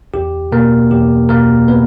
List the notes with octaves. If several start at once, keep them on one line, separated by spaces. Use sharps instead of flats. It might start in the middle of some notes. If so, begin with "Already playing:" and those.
E2 G4
B2 A#3 A#4
E2 G4
B2 A#3 A#4
B3 B4